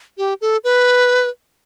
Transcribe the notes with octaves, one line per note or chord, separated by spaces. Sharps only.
G4
A4
B4